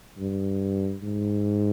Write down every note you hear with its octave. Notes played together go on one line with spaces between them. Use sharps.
G2
G#2